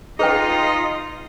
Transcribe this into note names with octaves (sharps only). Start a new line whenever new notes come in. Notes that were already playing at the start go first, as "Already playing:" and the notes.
D#4 F4 G#4 B4 D#5 G5